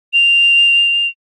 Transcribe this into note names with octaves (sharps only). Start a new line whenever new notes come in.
F7